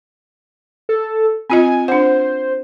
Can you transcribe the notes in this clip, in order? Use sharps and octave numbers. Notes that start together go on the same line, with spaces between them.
A4
C4 F4 D#5 G#5
D4 C5 F#5